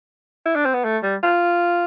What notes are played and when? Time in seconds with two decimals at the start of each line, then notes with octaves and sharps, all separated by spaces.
0.45 E4
0.56 D4
0.65 C4
0.74 B3
0.84 A3
1.03 G3
1.23 F4